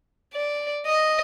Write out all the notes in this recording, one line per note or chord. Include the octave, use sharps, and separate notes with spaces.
D5
D#5